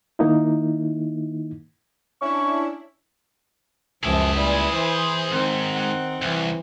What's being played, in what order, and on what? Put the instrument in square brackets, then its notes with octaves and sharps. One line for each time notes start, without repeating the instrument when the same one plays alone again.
[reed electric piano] D#3 A#3 D#4 E4
[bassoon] C#4 [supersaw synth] D4 E4 [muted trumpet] C#6
[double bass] C#2 [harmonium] F#2 F3 [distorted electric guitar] G#4 E5 [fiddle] D6
[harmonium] A#2 G3 [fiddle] E4 B4
[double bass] E3 [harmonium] C5
[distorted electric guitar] G#2 [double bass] D#3 [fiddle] C4
[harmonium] F#5
[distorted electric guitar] C2 [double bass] E3